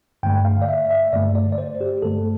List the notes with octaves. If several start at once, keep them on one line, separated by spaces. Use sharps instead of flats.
G2 D3 A3 G5
F5
D5
E5
E5
G2 D3 A3 D5
D5
D5
C5
G4
G2 D3 A3 A4